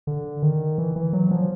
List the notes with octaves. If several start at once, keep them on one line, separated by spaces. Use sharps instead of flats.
D3
D#3
E3
E3
F#3
F3